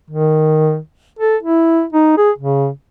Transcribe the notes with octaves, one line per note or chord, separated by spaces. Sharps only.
D#3
A4
E4
D#4
G#4
C#3